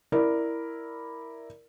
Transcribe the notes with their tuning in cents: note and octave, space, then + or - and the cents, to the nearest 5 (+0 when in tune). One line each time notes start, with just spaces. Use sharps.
E4 +0 A#4 +0 D5 +0